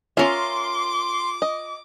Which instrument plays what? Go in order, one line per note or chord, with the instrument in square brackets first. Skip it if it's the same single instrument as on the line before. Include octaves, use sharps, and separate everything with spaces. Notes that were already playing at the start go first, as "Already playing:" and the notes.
[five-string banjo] C#4 E5 [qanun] F4 A#4 [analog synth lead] C6 [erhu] D6
[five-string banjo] D#5